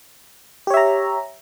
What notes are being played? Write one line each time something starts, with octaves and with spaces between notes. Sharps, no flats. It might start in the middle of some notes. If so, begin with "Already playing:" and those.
G4 C#5 E5 A#5